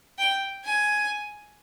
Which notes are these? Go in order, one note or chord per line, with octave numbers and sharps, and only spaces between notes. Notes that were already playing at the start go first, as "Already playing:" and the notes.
G5
G#5